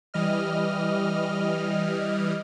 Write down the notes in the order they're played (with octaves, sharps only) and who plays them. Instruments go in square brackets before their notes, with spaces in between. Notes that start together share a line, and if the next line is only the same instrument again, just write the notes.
[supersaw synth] E3 G3 D#5 F6